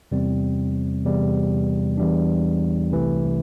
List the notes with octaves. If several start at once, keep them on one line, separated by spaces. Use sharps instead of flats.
E2 C3 G3 C4
E2 C3 G3
E2 E3 G3 D4
C2 C3 E3 A3